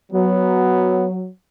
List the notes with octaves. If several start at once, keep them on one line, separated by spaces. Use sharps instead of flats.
F#3 B3